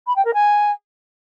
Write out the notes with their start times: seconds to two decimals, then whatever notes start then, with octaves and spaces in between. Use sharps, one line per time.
0.07 B5
0.16 G5
0.25 A#4
0.34 G#5